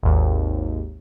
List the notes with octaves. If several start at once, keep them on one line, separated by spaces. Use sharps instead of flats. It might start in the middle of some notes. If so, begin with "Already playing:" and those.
G#1 D#2